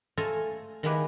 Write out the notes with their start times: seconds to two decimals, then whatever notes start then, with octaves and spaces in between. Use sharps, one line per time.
0.18 A3 F4 A4 C5 G#5 A#5
0.83 D#3 G#3 A#3 E4 G4 B4